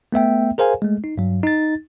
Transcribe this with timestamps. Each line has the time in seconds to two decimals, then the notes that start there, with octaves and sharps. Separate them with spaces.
0.12 A3 B3 E5 G5
0.58 G#4 A#4 C5 F5 G#5
0.82 G#3 A3
1.04 D#4
1.18 G2 F#3
1.43 D#4 A6